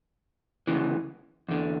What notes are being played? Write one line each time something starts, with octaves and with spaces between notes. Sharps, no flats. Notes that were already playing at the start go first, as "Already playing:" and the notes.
D2 C#3 E3
E2 D3